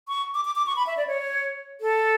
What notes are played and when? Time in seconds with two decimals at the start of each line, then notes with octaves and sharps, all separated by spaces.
0.08 C#6
0.34 D6
0.45 D6
0.55 D6
0.66 C#6
0.76 B5
0.87 E5
0.97 D5
1.07 C#5
1.81 A4